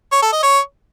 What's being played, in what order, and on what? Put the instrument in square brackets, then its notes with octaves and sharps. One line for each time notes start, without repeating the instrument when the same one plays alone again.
[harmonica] C#5
A4
D#5
C#5